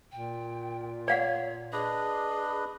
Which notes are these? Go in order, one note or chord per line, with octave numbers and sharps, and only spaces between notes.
A#2 G5
C#5 D5 F5 F#5
D4 G#4 B4 D#5